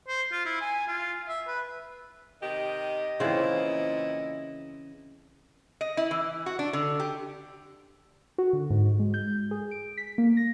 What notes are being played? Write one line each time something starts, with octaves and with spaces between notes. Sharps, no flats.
C5
F4
E4
G#5
F4
E5
B4
C3 D#3 G4 D#5
A#2 C#3 E3 C4 E4 F4
D#5
E4
E3
F#4
D4
D3
G4
F#4
D3
G#2
G#3
G6
G#4
D7
B6
A#3
A#6